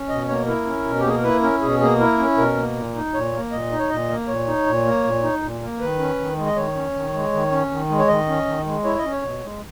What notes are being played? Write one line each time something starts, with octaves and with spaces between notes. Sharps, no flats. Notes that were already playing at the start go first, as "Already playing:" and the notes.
Already playing: C#4
B2 D#5
A#3 C#5
E4 A#4
C#4
B2
G4
A#3 G#4
A#4
E4 B4
C#4 A#4
B2 G#4
A#3 G#4
E4 A#4
C#4
B2 A#4
A#3
A#2
D#4
A#2 C#5
A#3
A#2 D#5
D#4
C#5
A#2 D#5
A#3
A#2 C#5
D#4
A#2
A#3
A#2
D#4
A#2
A#3
D#3 B4
C#4
D#3
G#3
D#5
D#3 C#5
C#4
D#3
G#3
D#3
C#4
D#3
G#3
C#5
D#3 D#5
C#4
D#3
G#3
E4 C#5
D#5
C#4
C#5
B2
G#3